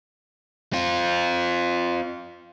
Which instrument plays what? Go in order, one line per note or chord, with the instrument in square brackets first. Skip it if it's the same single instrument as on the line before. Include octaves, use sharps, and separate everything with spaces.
[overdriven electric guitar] C4 F4